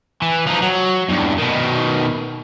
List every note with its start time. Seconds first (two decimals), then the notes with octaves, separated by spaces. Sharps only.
0.22 E3
0.47 F3 D#4
0.63 F#3
1.08 E2 G2
1.38 B2 D#3